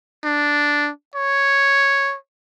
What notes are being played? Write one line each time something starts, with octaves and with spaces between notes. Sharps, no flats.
D4
C#5